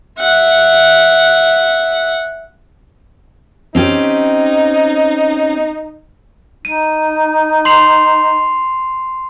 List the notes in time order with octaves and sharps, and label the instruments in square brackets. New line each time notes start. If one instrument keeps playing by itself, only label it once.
[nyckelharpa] E5 F#5
[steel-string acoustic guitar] C4 C#4 G4 [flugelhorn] D#4
[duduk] D#4 [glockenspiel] D#7
[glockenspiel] C6 C7 F7